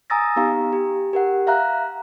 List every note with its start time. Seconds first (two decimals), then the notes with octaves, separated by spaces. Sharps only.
0.10 G#5 A#5 D#6 E6 A6 A#6
0.36 B3 D#4 G4 F5 A#5
0.73 G4
1.13 G4 A#4 F#5
1.47 E5 F5 A#5 F#6